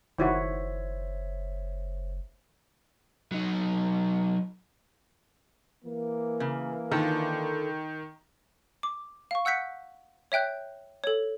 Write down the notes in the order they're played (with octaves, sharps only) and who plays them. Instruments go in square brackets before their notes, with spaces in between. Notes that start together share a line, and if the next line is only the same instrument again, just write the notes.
[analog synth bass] F#1 [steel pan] D#3 E4 F#4 [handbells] C5 C#5 E5
[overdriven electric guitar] F#3 D#4
[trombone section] E3 A#3
[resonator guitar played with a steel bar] C#3
[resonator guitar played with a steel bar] D3 F4 A4 [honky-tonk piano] D#3
[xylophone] D6
F5 C#6
F#5 E6 F#6 G6 B6 C#7
C#5 E5 G5 F#6 G6
A4 C#5